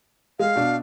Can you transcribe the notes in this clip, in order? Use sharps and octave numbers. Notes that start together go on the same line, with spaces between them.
G#3 F5
B2 D4